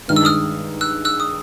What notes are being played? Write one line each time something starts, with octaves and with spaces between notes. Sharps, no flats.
G2 D#3 G#3 F6
E6
D#6 F6
E6 F#6
E6 F#6
D#6